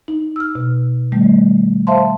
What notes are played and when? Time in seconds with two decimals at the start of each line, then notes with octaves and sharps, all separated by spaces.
0.08 D#4
0.36 E6 F6
0.55 B2
1.12 D#3 G3 A3
1.87 C5 E5 F5 A5 C6